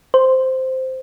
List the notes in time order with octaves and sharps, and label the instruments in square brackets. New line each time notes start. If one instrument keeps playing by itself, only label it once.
[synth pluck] C5